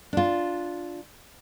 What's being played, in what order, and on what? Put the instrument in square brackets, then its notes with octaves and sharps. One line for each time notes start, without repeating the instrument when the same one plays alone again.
[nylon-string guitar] D4 F4